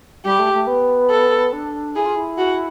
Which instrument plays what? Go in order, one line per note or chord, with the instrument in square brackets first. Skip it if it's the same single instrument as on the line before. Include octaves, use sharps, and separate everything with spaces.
[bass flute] G3 [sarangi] G4
[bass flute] A3
A3
B3
[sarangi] A4
[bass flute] D4
[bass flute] E4 [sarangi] G#4
[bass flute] F4
E4
[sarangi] F#4